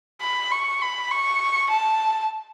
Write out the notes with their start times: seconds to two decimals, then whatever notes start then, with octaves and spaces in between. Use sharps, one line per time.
0.22 B5
0.51 C#6
0.81 B5
1.11 C#6
1.70 A5